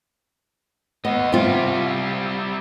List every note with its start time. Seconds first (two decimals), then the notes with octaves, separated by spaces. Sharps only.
1.05 D#2 B3 D#5
1.32 G3 C4 E4 F4